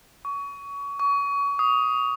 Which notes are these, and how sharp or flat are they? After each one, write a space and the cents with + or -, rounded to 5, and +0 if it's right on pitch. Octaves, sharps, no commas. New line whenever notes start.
C#6 +25
C#6 +30
D#6 +10